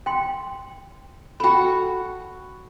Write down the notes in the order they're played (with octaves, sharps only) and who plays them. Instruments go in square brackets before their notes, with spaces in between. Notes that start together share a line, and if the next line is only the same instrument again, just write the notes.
[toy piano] G5 C6
[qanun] F#4 A4 [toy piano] G5 B5